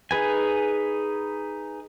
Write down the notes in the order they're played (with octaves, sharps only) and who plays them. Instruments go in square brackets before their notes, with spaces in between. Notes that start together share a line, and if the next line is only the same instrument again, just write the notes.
[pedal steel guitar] D#4 G#4 B4 G#5